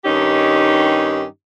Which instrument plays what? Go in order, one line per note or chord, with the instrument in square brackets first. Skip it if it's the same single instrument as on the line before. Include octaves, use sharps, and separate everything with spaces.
[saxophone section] G2 D#3 C#4 D#4 G4